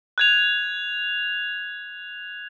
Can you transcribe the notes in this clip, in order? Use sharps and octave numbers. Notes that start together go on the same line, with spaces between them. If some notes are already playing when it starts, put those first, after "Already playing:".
F#6 G#6 F7